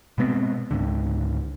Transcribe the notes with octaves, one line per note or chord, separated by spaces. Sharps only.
B2 G#3 B3 C4
C#2 G#2 D3